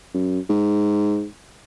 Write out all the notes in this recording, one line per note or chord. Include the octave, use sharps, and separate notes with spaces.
F#2
G#2